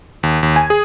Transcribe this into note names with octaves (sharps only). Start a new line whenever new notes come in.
D#2
D#2
G#5
G#4